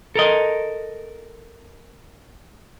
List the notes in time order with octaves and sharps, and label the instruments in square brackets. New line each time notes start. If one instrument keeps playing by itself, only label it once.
[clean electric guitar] A4 A#4 D#5